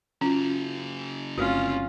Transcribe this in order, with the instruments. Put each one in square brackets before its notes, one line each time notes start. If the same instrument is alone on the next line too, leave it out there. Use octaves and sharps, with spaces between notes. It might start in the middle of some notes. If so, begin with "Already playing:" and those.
[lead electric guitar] C#3 F#3 [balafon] C#4 F4
[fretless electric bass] G1 C4 [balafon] A3 F#4 [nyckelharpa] C#4 F4